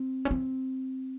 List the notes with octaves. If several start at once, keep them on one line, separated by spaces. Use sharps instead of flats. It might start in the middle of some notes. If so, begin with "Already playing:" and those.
Already playing: C4
C#4
C4